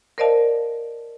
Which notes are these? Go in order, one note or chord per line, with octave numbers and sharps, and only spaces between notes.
A#4 C5 D5 D#5 F5 A5